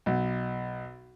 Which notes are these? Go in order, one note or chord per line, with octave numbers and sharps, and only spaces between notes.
B1